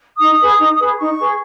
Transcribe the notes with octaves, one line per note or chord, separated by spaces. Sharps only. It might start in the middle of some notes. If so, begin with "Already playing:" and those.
D#4 D#6
G#4 B4
D#4
G#4 B4
D#4 C#6
G#4 B4